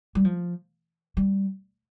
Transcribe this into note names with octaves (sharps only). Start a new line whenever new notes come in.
G3
F3
G3